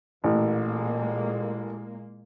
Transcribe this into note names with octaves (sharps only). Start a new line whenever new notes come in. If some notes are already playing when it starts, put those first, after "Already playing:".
A1 A#2 G#3 A#3